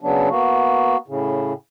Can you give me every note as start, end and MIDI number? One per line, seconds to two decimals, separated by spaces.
0.01 0.29 49
0.01 0.29 54
0.01 0.29 59
0.01 0.29 62
0.30 0.97 58
0.30 0.97 59
0.30 0.97 66
1.08 1.53 45
1.08 1.53 49